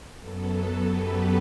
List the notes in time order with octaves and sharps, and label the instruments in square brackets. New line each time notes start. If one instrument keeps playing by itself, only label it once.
[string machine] F#2 F#3 B3 A4
G4 B4